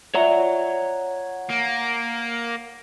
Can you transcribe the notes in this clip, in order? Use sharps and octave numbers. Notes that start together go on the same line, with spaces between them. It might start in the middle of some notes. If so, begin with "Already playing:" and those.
F4 C#5 D5 E5 F#5 A#5
A#3